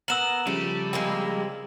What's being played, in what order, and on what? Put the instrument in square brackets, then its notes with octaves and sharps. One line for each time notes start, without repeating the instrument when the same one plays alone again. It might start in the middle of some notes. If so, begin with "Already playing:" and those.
[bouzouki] B3 A#4 [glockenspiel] E6 E7 F#7
[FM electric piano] C#3 F3 C#4 [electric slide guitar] G3 [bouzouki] A3
[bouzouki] G#3 A#3 C4